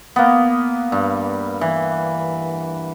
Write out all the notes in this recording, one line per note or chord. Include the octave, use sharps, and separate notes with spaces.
A#3 B3
G2
E3